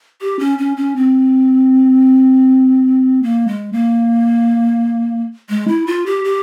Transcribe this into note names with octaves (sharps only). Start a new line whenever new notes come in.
G4
C#4
C#4
C#4
C4
A#3
G#3
A#3
G#3
E4
F4
G4
G4